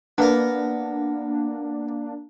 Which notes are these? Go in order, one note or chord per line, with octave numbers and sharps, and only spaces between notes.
A#3 B3 D4 A#4